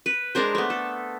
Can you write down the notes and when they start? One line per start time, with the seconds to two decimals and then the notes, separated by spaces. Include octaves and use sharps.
0.06 B4
0.35 G#3 D4 A#4 C5
0.55 A3 B3
0.70 A4